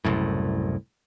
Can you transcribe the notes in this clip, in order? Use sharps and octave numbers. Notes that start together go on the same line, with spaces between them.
F#1 C2 F#2 A2